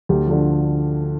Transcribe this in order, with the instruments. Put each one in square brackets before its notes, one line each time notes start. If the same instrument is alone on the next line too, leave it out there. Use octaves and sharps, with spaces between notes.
[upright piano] D2 G4
D3 F3